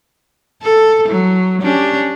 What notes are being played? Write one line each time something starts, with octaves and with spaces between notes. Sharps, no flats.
A4
F#3
C#4 D4 G4